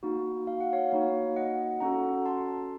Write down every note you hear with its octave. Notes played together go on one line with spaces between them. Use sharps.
A#3 D#4 F#4
F5
F#5
C#5 F5
A#3 D#4 F#4 C#5 F5
D#5 F#5
C#4 F#4 A4 F#5 A#5
A5 C6